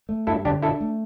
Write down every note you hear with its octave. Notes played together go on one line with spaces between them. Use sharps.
A3
G2 E4 A4
D3 D4 G4
D4 E4 A4
A3